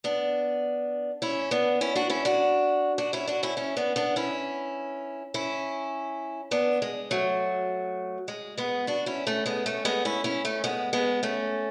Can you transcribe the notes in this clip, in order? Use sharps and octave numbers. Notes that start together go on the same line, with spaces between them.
B3 D4
C#4 E4
B3 D4
C#4 E4
D4 F#4
C#4 E4
D4 F#4
D4 F#4
C#4 E4
D4 F#4
C#4 E4
C#4 E4
B3 D4
B3 D4
C#4 E4
C#4 E4
B3 D4
G#3
F#3 A3
G#3
G#3 B3
D4 F#4
C#4 E4
A3 C#4
G#3 B3
A3 C#4
G#3 B3
C#4 E4
C#4 E4
A3 C#4
G#3 B3
G#3 B3
A3 C#4